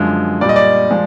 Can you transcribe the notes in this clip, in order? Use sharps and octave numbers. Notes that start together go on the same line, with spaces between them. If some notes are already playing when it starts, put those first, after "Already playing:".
Already playing: F#2 D3 F3 G#3
A#2 G3 D5
D#5
D5
F3 G#3